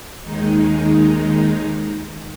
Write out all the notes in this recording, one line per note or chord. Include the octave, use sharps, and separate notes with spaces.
D#2 D#3 G#3 D#4